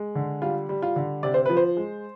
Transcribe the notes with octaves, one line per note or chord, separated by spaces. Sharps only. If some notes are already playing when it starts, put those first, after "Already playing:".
Already playing: G#3
D3
G3 F4
G3
F4
D3
C3 D5
C5
F3 B4
C5
G#3